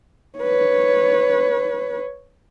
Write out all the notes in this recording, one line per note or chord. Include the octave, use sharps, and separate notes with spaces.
B4 C#5